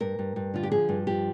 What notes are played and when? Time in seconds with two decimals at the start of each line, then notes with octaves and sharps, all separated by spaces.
0.01 G2 A#4
0.19 G2
0.36 G2
0.54 D3 F4
0.63 G4
0.71 F3 G#4
0.89 G2
1.07 F3 G4